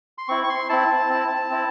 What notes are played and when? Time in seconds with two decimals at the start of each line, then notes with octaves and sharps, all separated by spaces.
0.18 C6
0.28 C4 E4 C#6
0.44 C#6
0.49 C6
0.69 C4 E4 A5
1.10 C4 E4
1.50 C4 E4